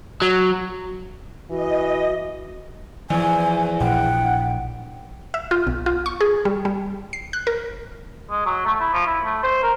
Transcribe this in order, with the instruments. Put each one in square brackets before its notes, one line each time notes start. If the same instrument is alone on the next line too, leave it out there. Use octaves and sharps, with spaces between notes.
[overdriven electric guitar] F#3
[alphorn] E3 [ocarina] F#4 [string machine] D#5
[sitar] E2 [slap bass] F3 [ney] G#5
[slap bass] A#1 [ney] F#5 [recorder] G5
[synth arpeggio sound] E5
F4
B1
F4
C#6
G#4
G3
G3
C7
F#6
A#4
[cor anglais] G#3
F#3
A3
E4
F3
E4
A3
C5
A#4